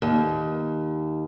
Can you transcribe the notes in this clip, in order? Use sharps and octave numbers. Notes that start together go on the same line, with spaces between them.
D#2